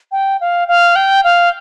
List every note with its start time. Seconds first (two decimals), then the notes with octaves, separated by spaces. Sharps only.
0.12 G5
0.41 F5
0.68 F5
0.96 G5
1.24 F5